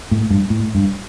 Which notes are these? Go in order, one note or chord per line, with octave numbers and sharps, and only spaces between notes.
A2
G2
A2
G2